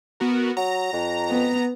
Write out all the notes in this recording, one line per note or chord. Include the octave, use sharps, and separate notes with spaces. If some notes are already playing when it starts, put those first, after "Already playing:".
B3 F#4 A#4
F#3 A#5
F2
B3